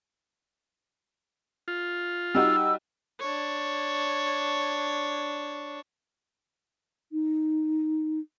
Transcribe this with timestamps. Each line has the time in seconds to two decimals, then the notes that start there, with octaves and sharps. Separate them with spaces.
1.68 F4
2.35 G3 D#4 F#4 E6
3.20 D4 C#5
7.12 D#4